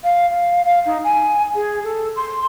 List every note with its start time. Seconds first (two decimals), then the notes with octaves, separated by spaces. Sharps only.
0.04 F5
0.30 F5
0.65 F5
0.86 D#4
1.04 G#5
1.55 G#4
1.84 A4
2.16 C6